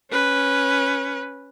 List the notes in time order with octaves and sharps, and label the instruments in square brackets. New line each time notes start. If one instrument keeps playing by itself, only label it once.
[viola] C#4 B4